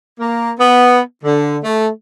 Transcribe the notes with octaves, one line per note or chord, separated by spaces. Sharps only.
A#3
B3
D3
A3